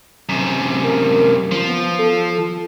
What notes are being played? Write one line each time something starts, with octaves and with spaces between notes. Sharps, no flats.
F#2 C3
A#4
F3
B3
A4